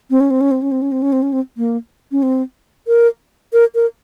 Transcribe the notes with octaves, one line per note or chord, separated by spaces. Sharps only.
C4
C#4
C4
C#4
C4
C#4
C4
C#4
C4
C#4
C4
C#4
C4
A#3
C#4
C4
A#4
A#4
A#4